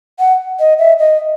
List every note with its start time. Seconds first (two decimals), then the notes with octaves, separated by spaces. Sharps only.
0.19 F#5
0.60 D#5
0.79 E5
0.99 D#5